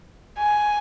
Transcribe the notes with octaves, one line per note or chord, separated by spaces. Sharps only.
G#5